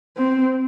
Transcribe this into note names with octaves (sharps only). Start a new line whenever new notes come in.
C4